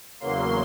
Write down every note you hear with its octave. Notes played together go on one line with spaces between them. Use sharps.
E2 C#3 F#3 A#3 C6